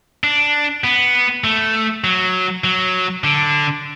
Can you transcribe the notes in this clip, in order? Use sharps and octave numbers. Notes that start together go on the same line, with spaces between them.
D4
B3
A3
F#3
F#3
D3